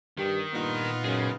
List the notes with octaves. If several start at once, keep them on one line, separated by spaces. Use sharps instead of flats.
G2 D#3 G4
G2 A#2 B3 D#4 F4
F#2 C#3 G#4